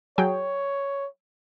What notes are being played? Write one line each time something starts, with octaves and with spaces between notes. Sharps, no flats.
F#3 G#4 C#5 G5